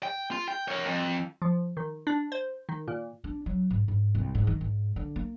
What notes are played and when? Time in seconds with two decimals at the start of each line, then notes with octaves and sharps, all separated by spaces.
0.03 G5
0.31 F4
0.48 G5
0.68 A#4 C#5
0.85 F2
1.42 F3
1.77 D#3
2.07 D4
2.32 C5
2.69 D#3
2.88 A#2
3.24 D4
3.46 F#3
3.70 G#2
3.88 G#2
4.15 C2
4.35 G#2
4.47 D#3
4.61 G#2
4.96 D3
5.16 A#3